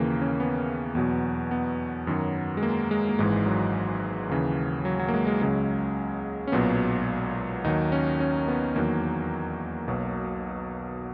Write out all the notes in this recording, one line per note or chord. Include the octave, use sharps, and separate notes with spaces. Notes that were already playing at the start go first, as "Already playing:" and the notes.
Already playing: D#2 C#3 E3 A#3
C#4
B3
E2 B2 F#3
B3
F#2 D#3 F#3
G#3
A#3
G#3
A#3
G#1 G#2 E3 G#3
F#3
D#2 C#3 E3
F#3
F#3
A#3
G#3
G#3
C#2 C#3 F#3 G#3
C#4
B1 A#2 F#3 B3
D#2 D#3 F#3 D#4
C#4
C#4
B3
E2 D#3 F#3 A#3
B1 B2 F#3